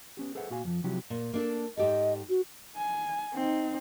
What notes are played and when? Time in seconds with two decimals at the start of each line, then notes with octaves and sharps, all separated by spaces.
0.17 B3 C#4 G4
0.35 G#4 A4 B4 C5 E5 F#5
0.50 A#2 F#4 F5 G#5
0.64 F2 F3
0.84 C3 F3 F#3 E4 F#4 G4
1.10 A#2
1.33 A#3 D4 A4
1.77 G#2 G4 A4 D#5
2.29 F#4
2.77 G#5
3.35 C4 D#4